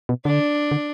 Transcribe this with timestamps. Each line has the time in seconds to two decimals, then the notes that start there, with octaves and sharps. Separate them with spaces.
0.09 B2
0.25 D3 D4
0.71 D3